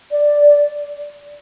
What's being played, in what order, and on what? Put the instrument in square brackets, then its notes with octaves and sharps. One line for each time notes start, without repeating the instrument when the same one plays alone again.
[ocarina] D5